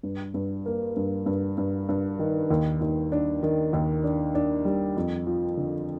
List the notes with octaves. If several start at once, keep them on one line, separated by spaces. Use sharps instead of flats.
G2
G2
A#3
G2
G2
G2
G2
D#3
D#2
D#2
D4
D#3
D#2
D4
D4
G3
F2
F3
D3